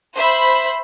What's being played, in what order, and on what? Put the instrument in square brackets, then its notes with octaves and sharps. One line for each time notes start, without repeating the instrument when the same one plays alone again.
[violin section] C5 E5 B5